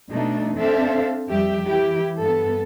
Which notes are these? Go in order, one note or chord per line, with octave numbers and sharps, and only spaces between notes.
B2 A3 D4 D#4
C4 D4 A4 C5 E5 F5
F2 G3 G4 E5
E3 E4 G4
G2 B3 A4